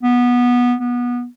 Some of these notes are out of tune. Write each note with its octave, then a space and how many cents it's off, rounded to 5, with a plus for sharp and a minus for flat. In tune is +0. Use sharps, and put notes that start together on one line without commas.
B3 -15
B3 -20